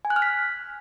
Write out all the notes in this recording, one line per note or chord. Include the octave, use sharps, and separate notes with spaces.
G#5
F#6
F6
B6